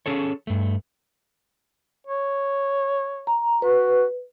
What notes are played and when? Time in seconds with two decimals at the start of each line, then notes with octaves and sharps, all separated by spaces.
0.06 C#4 G#4 A4 C#5
0.47 G2 A3
2.07 C#5
3.27 A#5
3.62 F#4 B4